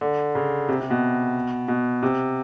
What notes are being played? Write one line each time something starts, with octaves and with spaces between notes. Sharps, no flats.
D3
C#3
C3
C3
B2
B2
C3